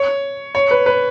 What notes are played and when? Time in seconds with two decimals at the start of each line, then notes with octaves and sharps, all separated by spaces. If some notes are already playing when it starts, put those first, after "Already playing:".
Already playing: C#5
0.55 C#5
0.71 B4
0.86 B4